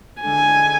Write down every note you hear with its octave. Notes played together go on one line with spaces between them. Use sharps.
D3 G#3 D4 A4 G#5